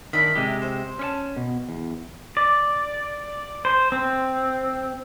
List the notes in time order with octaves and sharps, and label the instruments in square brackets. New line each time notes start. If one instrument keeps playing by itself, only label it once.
[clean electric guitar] D#3 D4 [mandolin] E5 B5
[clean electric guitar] C3 G#3 G4
[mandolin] C5
[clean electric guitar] C#4 C#5 A5
B2
E2
[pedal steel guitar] D5
C5
C4